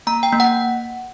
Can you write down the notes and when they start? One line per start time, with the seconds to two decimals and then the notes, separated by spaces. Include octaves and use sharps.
0.07 A#3 A#5
0.23 G5
0.33 A#3
0.40 F#5